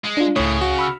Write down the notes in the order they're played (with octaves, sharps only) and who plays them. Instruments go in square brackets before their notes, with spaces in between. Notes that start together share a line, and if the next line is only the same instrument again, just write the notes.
[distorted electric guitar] G#3
[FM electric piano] D4 F4
[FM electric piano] C#2 C#5 [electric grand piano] A2 [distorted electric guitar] C#3
[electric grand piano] F#4
[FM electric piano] B5 E6 F6